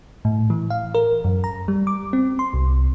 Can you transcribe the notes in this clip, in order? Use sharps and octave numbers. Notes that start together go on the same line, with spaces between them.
A2
E3
F5
A#4
F#2
A#5
G3
D6
C4
C6
C2